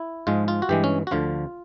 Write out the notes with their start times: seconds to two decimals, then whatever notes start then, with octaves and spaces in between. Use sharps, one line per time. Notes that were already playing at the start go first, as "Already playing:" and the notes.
Already playing: E4
0.27 G#2 F3 G#3 F4
0.48 F4
0.62 F#4
0.69 G2 E3 G#3 G4
0.84 C#4
1.07 F#4
1.11 D2 D3 F3 F4